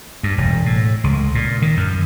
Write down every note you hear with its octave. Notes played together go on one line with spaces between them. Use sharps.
G2
E1
A2
C#2
A#2
D#3
F#2